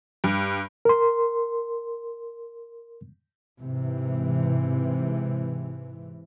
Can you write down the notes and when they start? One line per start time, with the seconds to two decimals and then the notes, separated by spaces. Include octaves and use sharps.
0.24 G2
0.85 A#4 C6
3.61 G#2 C3 E3